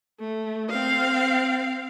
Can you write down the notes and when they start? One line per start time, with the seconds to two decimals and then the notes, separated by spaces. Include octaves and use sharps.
0.20 A3
0.70 C4 F5